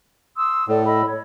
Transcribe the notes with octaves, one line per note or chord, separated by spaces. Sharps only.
C6 D#6 E6
A2 A4 D5
D#5 B5 E6
C#5